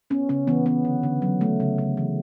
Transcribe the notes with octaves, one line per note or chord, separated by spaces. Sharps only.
B3 C#4
C#3 C#4
E3 B3
B3
D3
D3
F#3
A3
C#3
C#3
E3